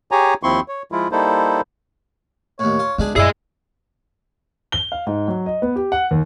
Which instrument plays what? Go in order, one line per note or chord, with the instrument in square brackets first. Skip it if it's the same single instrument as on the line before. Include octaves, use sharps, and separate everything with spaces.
[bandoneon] G4 G#4 C#5 G#5 A#5
D#2 F3 C4 E4 C6 C#6
C#5
F3 G#3 E4 F4
G3 A#3 D#4 E4 A4 C5
[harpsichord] D#2 A2 [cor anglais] C#5
[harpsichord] F4
[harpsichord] C#2 D4 G#4 [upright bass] B3
[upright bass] F#2 A#2 [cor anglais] E4 [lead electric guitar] G#4 D#5 [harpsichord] D5
[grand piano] G7
F5
G#2
F#3
D#5
B3
G4
F#5
D#2